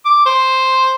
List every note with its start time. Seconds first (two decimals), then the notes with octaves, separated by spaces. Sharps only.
0.05 D6
0.26 C5